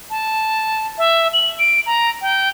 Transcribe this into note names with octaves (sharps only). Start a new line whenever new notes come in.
A5
E5
F#7
D7
A#5
G5